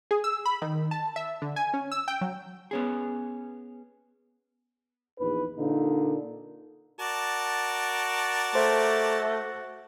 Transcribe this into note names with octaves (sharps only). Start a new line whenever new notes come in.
G#4
E6
B5
D#3
A5
E5
D3
G#5
C#4
E6
G5
F#3
B3 C#4 G#4
A#1 E2 D#4 B4
A#2 D3 A#3 D#4
F#4 A#4 D5 A5
A3 C5